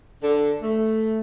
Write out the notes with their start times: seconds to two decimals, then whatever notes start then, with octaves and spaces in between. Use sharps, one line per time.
0.23 D3
0.63 A3